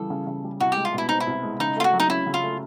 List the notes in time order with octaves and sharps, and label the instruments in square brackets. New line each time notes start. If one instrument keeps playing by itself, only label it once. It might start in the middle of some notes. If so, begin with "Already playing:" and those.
Already playing: [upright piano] C#3 E3 G3 [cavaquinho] A4
[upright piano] C#3
C#3
G3
[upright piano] C2 [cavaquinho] F#4
[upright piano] G#3 [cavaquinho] G4
[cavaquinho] F4
[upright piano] B2
[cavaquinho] E4
[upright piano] C4 [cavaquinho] D#4
[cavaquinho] E4
[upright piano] C2
G#3
[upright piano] C#3 [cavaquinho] D#4
[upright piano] A3 [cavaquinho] F4
[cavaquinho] F#4
[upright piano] F#3
[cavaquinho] D#4
[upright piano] C#4 [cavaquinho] E4
[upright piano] C#3
[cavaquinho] F4
[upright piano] A3